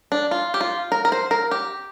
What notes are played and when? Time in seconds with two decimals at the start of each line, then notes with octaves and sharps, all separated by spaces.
0.12 D4
0.31 F4
0.54 G4
0.61 F4
0.92 A#4
1.05 A#4
1.12 C5
1.31 A#4
1.51 G4